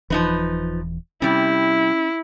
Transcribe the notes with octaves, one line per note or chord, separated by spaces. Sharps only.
D#1 E3 F3 D#4 B4
C3 G3 C#4 E4